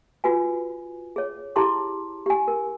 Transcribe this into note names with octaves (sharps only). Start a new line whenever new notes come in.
F4 F#4 B4 G#5
G#4 C#5
E4 G4 G#4 A5 C6 D6
G4 G#5
A#4